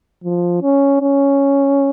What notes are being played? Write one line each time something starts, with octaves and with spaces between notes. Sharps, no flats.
F3
C#4
C#4